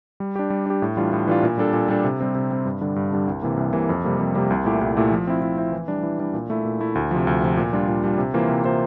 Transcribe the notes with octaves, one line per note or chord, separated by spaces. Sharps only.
G3
D4 G4
G3
D4 G4
A2
E3 G3 D4 F4
A2
E3 G3 D4 F4
A#2
G3 D4 A4
A#2
G3 D4 A4
C3
G3 C4
C3
G3 C4
G2
D3 G3 D4
G2
D3 G3 D4
C2
C3 E3 A#3
C2
C3 E3 A#3
F2
C3 G3 A#3
F2
C3 G3 A#3
C2
A#2 A3 E4 G4
C2
A#2 A3 E4 G4
F3
C4 E4
F3
C4 E4
E3
G3 D4
E3
G3 D4
A#2
A3 E4
A#2
A3 E4
D2
C3 F3
D2
C3 F3
A#2
G3 D4 F4
A#2
G3 D4 F4
C3
E3 A#3 F4 C5
C3
E3 A#3 F4 C5